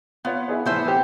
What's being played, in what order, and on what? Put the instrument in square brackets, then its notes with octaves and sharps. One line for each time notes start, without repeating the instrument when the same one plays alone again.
[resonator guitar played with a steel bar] B3 [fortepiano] F4 C#5
[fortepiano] E4 G#4 C#5
[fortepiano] A2 E3 [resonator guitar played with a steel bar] B3 C5 E5
[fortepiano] C4 G4